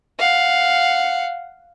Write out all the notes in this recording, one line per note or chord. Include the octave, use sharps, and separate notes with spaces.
F5 F#5